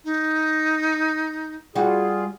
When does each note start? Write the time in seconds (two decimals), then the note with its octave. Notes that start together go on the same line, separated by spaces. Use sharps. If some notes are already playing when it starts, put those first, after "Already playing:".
0.04 D#4
1.75 G3 F4 F#4 G#4